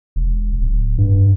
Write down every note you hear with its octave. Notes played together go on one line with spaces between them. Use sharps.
E1
D1
G2